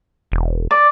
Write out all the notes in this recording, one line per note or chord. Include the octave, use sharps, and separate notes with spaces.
E1
D5